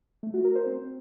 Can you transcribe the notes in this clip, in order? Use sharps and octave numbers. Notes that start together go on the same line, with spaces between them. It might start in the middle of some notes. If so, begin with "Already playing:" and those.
A3
F#4
A#4
C5
C4